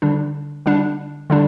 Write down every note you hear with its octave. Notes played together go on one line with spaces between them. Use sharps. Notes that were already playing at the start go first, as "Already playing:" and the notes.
D3 G3 D4
D3 G3 D4
D3 G3 D4